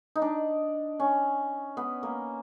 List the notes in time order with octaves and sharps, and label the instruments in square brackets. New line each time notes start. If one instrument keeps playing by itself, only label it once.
[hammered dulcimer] D#4
D4
C#4
B3
A#3